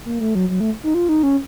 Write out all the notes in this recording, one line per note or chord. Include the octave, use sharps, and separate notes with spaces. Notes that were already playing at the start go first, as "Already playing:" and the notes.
A#3
A3
F#3
F#3
A3
D#4
F4
D#4
C#4